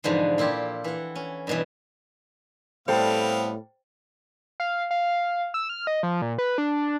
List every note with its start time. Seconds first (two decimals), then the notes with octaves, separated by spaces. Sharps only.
0.04 E2 G#2 B2 D3 F3
0.38 A#2 E4 F4 G4 A4
0.84 E3 F#5
1.16 C#4
1.47 G2 B2 E3
2.88 A2 G3 B3 C4 A4 C5 F5 G5
4.60 F5
4.91 F5
5.54 E6
5.69 F6
5.87 D#5
6.03 F3
6.22 A#2
6.38 B4
6.58 D4